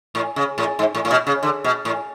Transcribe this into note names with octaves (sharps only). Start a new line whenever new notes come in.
A2
C#3
A2
G#2
A2
A2
B2
C#3
D3
B2
A2